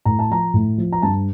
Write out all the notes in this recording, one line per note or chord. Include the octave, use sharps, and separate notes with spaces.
A2 A#5
A5
F3 A#5
A2
F3
A#5
G2 A5